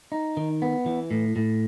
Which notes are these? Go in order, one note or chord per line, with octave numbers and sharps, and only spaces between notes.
D#4
D#3
B3
E3
A2
A2